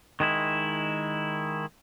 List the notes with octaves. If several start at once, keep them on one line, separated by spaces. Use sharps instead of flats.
D#3 G#3 E4